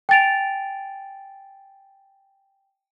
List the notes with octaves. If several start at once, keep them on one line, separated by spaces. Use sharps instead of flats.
G5 G#5 A6 D7 F7